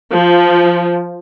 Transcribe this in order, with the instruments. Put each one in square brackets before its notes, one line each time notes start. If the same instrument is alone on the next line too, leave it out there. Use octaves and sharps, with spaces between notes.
[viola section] F3